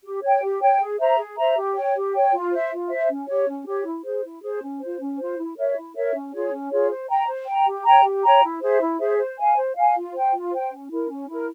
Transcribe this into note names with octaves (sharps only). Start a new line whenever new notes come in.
G4
C#5 G5
G4
C#5 G5
G#4
C5 E5 A#5
G#4
C5 E5 A#5
G4
C#5 G5
G4
C#5 G5
F4
C5 E5
F4
C5 E5
C#4
G4 C#5
C#4
G4 C#5
E4
G#4 C5
E4
G#4 C5
C#4
F4 C5
C#4
F4 C5
E4
A#4 C#5 E5
E4
A#4 C#5 E5
C#4
F4 G#4 C#5
C#4
F4 G#4 C#5
C5
G5 A#5
C5
G5 A#5
G4
C#5 G5 A#5
G4
C#5 G5 A#5
E4
G#4 C5 E5
E4
G#4 C5 E5
C5
F5 G#5
C5
F5 G#5
F4
C5 G5
F4
C5 G5
C#4
E4 A#4
C#4
E4 A#4